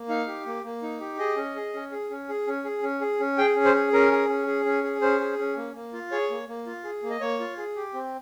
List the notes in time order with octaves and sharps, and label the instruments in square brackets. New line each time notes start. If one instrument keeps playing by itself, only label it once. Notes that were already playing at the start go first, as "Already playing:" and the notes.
Already playing: [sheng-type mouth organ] A#3
D#4 F5
G4
A#3
A#3
D#4
G4
G#4 D#5
C#4
G#4
C#4
G#4
C#4
G#4
C#4
G#4
C#4
G#4
C#4
G#4 G5
C#4
C5
G#4
C#4 A#4
G#4
C#4
G#4
C#4
G#4
C#4 C5
G#4
C#4
A#3
A#3
F4
G#4 C#5
A#3
A#3
F4
G#4
A#3
D#5
A#3 C#5
F4
G#4
G4
C4